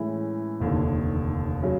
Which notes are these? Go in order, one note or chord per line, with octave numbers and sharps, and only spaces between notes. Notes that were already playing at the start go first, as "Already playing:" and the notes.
Already playing: A2 E3 G#3 C#4 E4
F1 D#2 D3
C#3 F#3